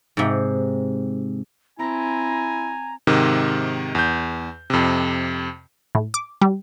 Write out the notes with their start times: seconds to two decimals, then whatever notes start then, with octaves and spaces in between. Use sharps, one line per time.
0.17 G#2 C3
1.79 C4 E4 G#5 A#5
3.07 G#2 C3 D#3
3.95 E2 G6
4.70 F2 C3
5.95 A2
6.14 D6
6.42 G3